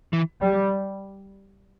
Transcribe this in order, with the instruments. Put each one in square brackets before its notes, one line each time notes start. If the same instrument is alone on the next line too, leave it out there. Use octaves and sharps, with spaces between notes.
[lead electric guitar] E3
[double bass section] G3